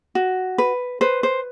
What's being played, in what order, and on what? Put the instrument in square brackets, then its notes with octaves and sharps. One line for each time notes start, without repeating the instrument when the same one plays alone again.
[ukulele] F#4
B4
B4 C5
C5